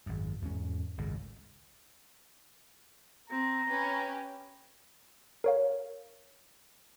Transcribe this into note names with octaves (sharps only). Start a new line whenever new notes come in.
G#1 F#2
E2 G#2 A3 C#4
G#1 C#2 F#2 A2
C4 A#5
C#4 G4 B4
A#4 C#5 F5